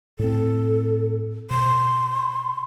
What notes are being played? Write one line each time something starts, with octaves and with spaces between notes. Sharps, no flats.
A2 C4 A4
B2 C6